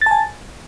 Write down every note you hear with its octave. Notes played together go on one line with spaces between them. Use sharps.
G#5 A5 A6